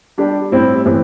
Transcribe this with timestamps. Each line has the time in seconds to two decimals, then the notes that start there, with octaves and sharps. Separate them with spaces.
0.18 G3 D4 G4
0.52 A2 G3 C4 E4
0.85 A2 E3 C4 G4